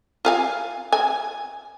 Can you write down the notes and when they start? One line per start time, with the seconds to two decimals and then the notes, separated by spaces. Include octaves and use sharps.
0.25 F4 F5 G#5
0.92 G#5